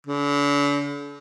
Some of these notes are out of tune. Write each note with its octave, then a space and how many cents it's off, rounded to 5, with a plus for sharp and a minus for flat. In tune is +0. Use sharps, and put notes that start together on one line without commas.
D3 -45